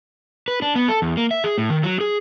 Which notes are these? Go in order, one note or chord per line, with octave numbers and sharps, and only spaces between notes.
B4
D4
B3
A4
E2
A#3
E5
G#4
A2
D#3
F#3
G#4